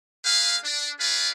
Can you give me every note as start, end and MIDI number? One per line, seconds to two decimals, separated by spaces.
0.25 0.57 58
0.25 0.57 68
0.25 0.57 71
0.25 0.57 77
0.64 0.90 62
0.99 1.29 65
0.99 1.29 68
0.99 1.29 71
0.99 1.29 74
0.99 1.29 77